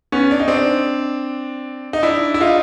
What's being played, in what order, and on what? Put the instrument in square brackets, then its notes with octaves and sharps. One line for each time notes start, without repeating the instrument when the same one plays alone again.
[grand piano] B3 C#4
D4
D#4
C4 D4
D#4
D4 E4
E4
D#4 F4